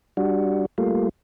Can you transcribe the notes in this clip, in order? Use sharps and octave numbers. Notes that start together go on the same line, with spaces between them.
G3 D4 F#4
G3 A3 A#3 F4